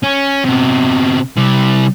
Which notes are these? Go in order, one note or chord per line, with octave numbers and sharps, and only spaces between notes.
C#4
C3 B3
C3 G3